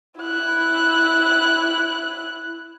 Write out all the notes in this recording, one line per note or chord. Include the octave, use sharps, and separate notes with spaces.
E4 F#6